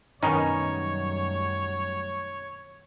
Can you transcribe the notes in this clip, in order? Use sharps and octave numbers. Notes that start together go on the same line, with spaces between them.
F#2 B2 D#3 G3 A3 C#4 D#4 C#5